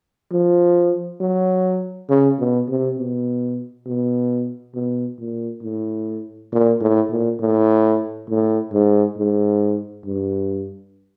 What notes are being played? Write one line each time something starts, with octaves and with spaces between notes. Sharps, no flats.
F3
F#3
C#3
B2
C3
B2
B2
B2
A#2
A2
A#2
A2
A#2
A2
A2
G#2
G#2
G2